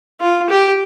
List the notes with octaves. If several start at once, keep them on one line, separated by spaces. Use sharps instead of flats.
F4
G4